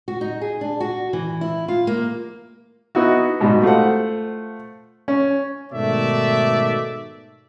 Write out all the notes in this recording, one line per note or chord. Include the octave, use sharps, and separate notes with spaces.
F#4
D#4
G#4
D4
F#4
E3
E4
F4
A#3
B3 D#4 E4 F#4
G#2 B2 G3 D#4
A3 F4 C5 F#5
C#4
G#2 B2 D#3 A3 D5 E5